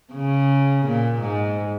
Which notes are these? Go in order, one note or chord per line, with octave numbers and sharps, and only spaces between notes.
C#3
A#2
G#2